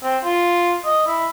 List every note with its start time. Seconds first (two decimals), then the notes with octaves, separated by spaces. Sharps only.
0.03 C4
0.24 F4
0.86 D#5
1.07 E4